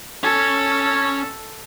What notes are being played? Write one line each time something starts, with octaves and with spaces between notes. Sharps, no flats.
C#4 A4 G#5